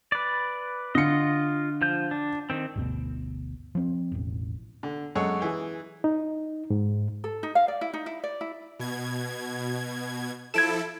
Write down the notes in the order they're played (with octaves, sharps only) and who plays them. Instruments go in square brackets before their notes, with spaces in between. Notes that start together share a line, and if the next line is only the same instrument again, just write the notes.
[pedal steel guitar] B4 D5
[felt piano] D3 C#7 [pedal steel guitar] F4 D#5
[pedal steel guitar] F3 G6
D4
D#3 C4
[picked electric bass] G1 D2 B2
F3 C4
E1 A1
[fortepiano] D3
F#2 G#3 A4 C#5 F#5 C#6
E3 G#4
[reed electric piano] D#4
G#2
[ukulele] A4
D#4
F5
D5
E4
D#4
E4
D5
E4
[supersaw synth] B2 G#6
[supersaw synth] F3 E4 A4 [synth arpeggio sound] G#6 D7 E7